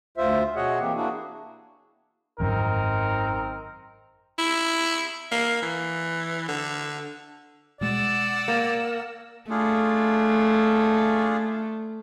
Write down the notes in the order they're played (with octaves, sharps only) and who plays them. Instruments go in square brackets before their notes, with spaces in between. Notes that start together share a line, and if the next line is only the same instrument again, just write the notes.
[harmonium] D2 F4 C5 E5
B2 F#4 G#4 C#5 D#5 F#5
E3 A#3 C4 G4
A#3 D4 E4 F#4 G#4
[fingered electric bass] G#1 F#2 [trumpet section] C4 D#4 A#4
[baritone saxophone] E4
A#3
E3
D3
[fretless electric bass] B2 G#3 [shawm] D5 [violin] F#5 E6
[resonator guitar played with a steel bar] A#3
[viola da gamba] A3 [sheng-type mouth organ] D4 F4 G#4